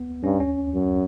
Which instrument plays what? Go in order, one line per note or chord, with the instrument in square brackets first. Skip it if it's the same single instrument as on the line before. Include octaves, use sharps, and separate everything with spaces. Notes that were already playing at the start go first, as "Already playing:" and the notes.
Already playing: [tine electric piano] B3
[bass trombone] G2 [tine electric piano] C#4
[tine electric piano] C#4
[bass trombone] F#2